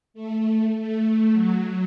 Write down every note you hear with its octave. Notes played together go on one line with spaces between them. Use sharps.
A3
A3
F#3